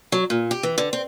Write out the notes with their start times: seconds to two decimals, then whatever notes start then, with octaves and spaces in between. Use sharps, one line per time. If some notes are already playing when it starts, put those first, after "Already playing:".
0.12 F#3
0.30 A#2
0.51 G4
0.63 E3
0.78 D3
0.93 C4